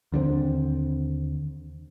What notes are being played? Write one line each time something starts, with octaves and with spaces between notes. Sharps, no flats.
D#2 D3 F3 C4